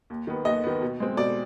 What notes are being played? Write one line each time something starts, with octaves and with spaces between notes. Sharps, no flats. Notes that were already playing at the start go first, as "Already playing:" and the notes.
D#2
D#3 B3
D#2 D#5
D#3 B3
B2
G#3 C4
B2 D5